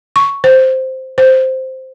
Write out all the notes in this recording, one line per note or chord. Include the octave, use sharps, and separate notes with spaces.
C#6
C5
C5